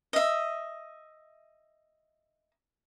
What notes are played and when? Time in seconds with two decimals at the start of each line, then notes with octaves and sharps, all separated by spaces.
0.13 D#5 E5